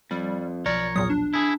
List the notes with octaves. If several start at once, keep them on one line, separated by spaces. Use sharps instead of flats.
F2 G3
B1 F3 A#4 C#5 D5
E2 A#2 F#3 D#6
D4
E4 G#4